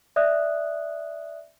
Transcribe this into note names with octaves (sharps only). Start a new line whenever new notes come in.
D5 E5 D#6 F#6